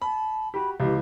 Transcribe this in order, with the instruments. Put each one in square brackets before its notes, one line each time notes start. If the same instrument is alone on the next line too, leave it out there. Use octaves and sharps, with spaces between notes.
[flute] A5 [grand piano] B5
[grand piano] F#4 G4 [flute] B5
[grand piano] C#2 E3 [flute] G4